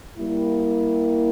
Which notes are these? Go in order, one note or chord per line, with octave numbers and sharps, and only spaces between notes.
G3 A#3 E4